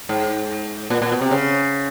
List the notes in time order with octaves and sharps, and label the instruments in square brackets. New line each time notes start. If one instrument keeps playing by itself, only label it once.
[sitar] G#2
A#2
A#2
B2
C3
C#3